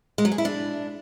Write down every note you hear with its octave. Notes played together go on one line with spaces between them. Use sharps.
G#3
F#3
G#4
E4
D4